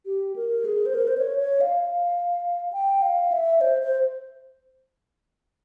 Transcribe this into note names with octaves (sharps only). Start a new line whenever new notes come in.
G4
A#4
G#4
C5
A#4
C5
C#5
C#5
F5
F5
G5
F5
E5
C5
C5